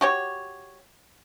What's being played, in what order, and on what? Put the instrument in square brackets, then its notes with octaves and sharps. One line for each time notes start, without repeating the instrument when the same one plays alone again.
[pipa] F#4 G4 C#5